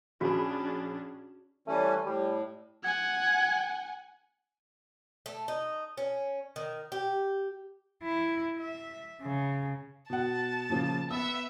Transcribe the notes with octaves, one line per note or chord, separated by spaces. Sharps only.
A#1 C#4 D4 F#4 G#4 B5
E3 G3 A3 C#4
A2 G3
F#5 G#5 G#6
A3
D#4
C#4
D#3
G4
E4
E5
C#3
B2 F#5 A5
A#2 C#3 F3
B3 E5 E6